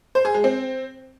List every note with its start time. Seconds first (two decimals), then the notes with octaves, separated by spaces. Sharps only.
0.15 C5
0.25 G#4
0.34 G#3
0.44 C4